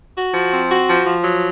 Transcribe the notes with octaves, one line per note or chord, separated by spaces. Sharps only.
F#4
F3
C4
F#4
F3
F3
F#3